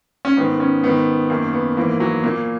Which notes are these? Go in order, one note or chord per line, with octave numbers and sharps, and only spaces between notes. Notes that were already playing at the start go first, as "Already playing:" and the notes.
C#4
G#2 D#3 B3
C#4
G#2 D#3 B3
F#2 D#3 A#3
B3
G#2 E3 A#3
F#3
A#2 A#3